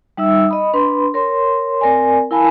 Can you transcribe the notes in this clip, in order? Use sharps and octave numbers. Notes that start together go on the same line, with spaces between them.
G3 D#4 E5 E6
D#5 B5 D#6
D4 B4 B5 C6
A#4 C#5 C6
C4 A#4 D5 G#5
E4 A#4 F5 G#5 A5 B5